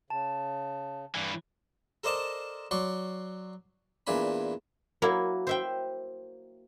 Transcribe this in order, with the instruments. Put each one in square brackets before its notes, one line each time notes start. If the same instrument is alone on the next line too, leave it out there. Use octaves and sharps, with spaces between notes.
[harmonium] C#3 [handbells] A5
[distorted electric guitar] G2 E3
[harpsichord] A4 A#4 C5 D5 D#5 A5
F#3 D5 C6 C#6
E2 A#2 D4 G#5 B5
[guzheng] F#3 A#3 E4
C5 E5 G5